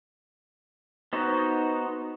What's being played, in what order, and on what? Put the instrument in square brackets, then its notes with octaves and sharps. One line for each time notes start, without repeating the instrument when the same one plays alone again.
[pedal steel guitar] B3 D#4 F#4 C5 D#5